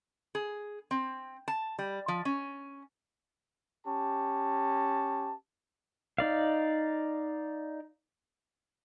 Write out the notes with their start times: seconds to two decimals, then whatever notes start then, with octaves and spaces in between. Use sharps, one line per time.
0.35 G#4
0.91 C4
1.48 A5
1.79 G3
2.08 F3
2.25 C#4
3.86 C#4 G4 A5
6.18 D#4 D5 F5